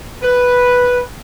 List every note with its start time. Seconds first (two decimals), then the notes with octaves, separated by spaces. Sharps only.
0.23 B4